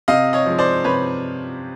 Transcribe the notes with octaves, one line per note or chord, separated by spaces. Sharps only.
C3 D#5 F5
C#5 D#5
F3 G#3
C5 D5
C3 B4 C#5